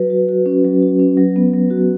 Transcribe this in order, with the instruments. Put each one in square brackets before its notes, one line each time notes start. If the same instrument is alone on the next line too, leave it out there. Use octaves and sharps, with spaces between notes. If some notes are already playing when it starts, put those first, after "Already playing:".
Already playing: [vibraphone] F#3 F#4 B4
F#4
F#4
C#4
F#3
F#4
C#4
F#3
B3
F#3
F#4